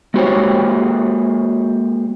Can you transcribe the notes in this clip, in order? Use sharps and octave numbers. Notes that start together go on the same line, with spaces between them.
G#3 A#3 F#4 G4 C5 C#5